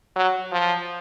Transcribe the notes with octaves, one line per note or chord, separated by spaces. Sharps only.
F#3
F3